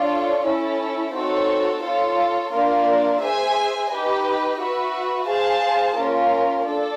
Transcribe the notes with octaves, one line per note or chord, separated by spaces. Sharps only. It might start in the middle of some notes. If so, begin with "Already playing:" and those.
Already playing: D4 F4 A4 C#5
C#4 E4 A4
C4 D#4 F#4 A4 C#5
F4 A4 C#5
A#3 D4 F4 A#4 D5
G#4 C5 E5 G#5
D#4 G4 B4 D#5
F#4 B4 E5
G#4 C5 F5 A5
A#3 C#4 F4 A#4
D4 A4